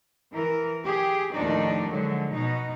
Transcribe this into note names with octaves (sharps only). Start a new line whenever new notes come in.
E3 A#4
G4 G#4
D#2 A2 F3 D4 D#4 D5
D3 F3 F#3 G#3
B2 D#4